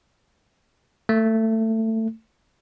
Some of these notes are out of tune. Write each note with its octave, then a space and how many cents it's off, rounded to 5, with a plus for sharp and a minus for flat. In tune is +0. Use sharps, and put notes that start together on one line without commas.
A3 +20